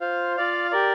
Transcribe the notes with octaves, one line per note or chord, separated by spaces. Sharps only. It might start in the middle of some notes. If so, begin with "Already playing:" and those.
F4 C5 F5
F4 D5 F5
G4 A#4 D5